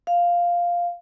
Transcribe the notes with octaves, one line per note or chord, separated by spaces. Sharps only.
F5